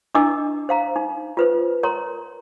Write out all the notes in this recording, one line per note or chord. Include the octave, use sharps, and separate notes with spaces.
D4 E4 D#5 D6 E6
C5 F5 A#5
D#4
F4 B4 C5
A#4 C#5 A#5 C6